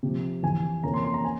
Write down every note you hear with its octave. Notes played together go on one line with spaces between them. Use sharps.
C3 F3 C4
F2 C3 E3 G#5
F2 C3 E3 A#3 C#4 A#5
C6
C6
A#5
G#5